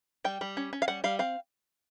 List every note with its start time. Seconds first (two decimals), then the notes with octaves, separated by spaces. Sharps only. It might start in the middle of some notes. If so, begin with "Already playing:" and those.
0.24 G3 G5
0.41 G3
0.57 C#4
0.73 C#4
0.82 F5
0.88 G3 F#5
1.04 G3 F5
1.19 C4 F5